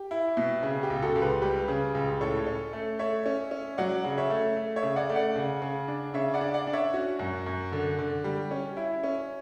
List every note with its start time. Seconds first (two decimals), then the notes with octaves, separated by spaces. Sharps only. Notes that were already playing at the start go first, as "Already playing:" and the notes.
Already playing: G4
0.11 E4
0.37 B2
0.63 C#3
0.83 G4
0.90 C#2
1.02 F#4 A4
1.15 C#2
1.22 G4 B4
1.42 G3 G4 B4
1.68 C#3
1.95 C#2
2.21 A2 A4 C#5
2.46 C#4
2.73 A3
2.99 A3 C#5 E5
3.26 C#4
3.51 C#4
3.78 F#3 D5 F#5
4.05 C#3
4.18 C#5 E5
4.30 A3
4.57 A3
4.76 C#5 E5
4.83 C#3
4.96 D5 F#5
5.09 A3
5.16 D5 F#5
5.36 C#3
5.62 C#3
5.88 D4
6.14 C#3 C#5 E5
6.34 D5 F#5
6.41 D4
6.54 D5 F#5
6.67 D4
6.73 C#5 E5
6.93 C#4 F#4
7.19 F#2
7.46 F#2
7.72 D3
7.99 D3
8.24 G3
8.51 C#4
8.77 E4
9.04 C#4